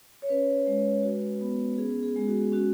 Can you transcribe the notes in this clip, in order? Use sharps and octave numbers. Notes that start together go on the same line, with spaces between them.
C#5
C#4 B4
G#3
F#4
B3
C#4 G#4
G#4
G#3
F#4
C#4 F#4